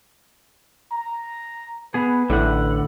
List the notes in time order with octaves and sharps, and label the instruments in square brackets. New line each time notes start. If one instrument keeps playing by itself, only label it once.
[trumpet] A#5
[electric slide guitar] B3 G#4 [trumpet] B4
[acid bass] A1 [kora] A2 [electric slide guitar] D3 F#5